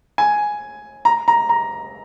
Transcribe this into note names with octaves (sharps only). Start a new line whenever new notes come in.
G#5
A#5
A#5
A#5